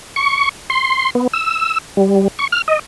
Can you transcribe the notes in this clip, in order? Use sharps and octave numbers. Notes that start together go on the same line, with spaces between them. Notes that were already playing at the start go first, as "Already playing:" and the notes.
C#6
C6
B3
E6
G3
C#6
F6
D#5